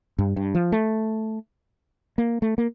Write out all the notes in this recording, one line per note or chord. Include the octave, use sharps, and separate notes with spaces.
G2
G2
F3
A3
A#3
A3
A#3